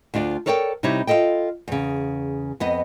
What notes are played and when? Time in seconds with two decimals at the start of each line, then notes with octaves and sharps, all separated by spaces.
0.14 D2 D4 F4 D5
0.46 A4 A#4 C#5 D5 F#5 G5
0.83 C3 G3 D#4 E4 C#5
1.07 F4 G#4 A4 D#5 G5
1.68 E2 C#3
2.60 F2 B3 D#5